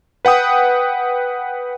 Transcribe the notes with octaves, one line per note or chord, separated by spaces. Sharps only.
B4 F#5 G5 D#6